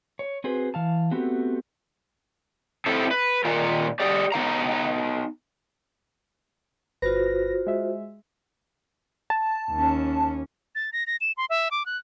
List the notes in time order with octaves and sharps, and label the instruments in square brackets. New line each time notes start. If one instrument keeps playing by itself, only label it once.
[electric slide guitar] C#5
C4 F#4 G#4 B4 C5
E3 F5 A5
A3 B3 C4 F#4 G4
C4 E4 A4
B4
A#2 D#3 F4 A#4
G4 G#4 D5
B3 D#4 F5 A#5
[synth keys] G1 B4 A#6 [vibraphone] F4 F#4 C5
[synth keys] G#3 E5
[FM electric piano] A5
[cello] D#2 C#4
[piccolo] A6
A#6
A#6
E7
C6
E5
D6
F#6